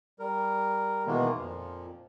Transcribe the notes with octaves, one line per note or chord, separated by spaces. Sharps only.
G3 A#4
B2 D#3 E3 G#3 A#3 B3
F2 A#2 F3